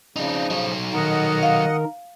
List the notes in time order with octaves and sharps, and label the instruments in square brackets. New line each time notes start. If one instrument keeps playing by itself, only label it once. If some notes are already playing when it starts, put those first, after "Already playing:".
[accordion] C#3 F3 [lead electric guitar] D4 D#4
[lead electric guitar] F#3 D#4
[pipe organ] D#3 A#4 [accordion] D#5 F#5
[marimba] F5